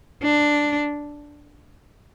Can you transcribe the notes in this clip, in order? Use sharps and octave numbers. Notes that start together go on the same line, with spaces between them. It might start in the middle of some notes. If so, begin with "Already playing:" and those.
D4